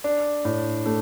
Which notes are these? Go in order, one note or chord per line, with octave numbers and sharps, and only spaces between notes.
D4
A2
A3